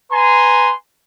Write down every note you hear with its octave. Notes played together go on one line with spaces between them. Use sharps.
B4 G#5 A#5 C6